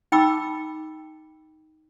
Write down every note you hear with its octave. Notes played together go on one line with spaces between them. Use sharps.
D#4 G5 B5 D6 E6